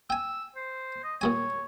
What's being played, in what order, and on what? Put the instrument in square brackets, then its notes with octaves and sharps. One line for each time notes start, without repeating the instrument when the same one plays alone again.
[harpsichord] G5 G#5 [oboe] E6
[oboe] C5
D#5
[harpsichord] A#2 G3 G#5 [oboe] C#5